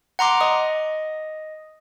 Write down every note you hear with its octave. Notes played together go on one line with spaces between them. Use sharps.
F#5 A#5 C6 D6
D#5 D#6